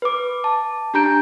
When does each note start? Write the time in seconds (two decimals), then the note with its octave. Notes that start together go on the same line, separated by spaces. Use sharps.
0.02 B4 D6
0.44 A5
0.94 D4 G4 A#5 G6 D7